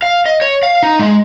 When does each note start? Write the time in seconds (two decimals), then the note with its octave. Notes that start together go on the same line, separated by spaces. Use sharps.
0.02 F5
0.26 D#5
0.41 C#5
0.63 F5
0.83 D#4
0.99 G#3